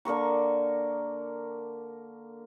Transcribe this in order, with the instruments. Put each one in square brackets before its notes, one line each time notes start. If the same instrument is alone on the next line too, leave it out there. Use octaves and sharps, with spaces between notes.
[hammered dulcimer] D3 A#3 A#4 C#6